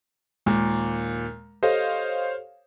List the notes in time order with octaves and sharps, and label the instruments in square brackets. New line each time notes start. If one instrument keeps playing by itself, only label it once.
[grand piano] D#2 A#2 A#3 [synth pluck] G#3
[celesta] G4 A4 [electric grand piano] C5 C#5 F5 [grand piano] D#5